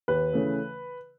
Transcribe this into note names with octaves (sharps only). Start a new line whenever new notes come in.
D#2 B4
C#3 E3 A3